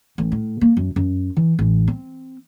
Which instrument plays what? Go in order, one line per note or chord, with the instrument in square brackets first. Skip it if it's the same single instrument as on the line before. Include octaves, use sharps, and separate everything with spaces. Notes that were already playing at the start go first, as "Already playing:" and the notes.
[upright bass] A1
A2
A#3
F#2
F#2
E3
A1
C4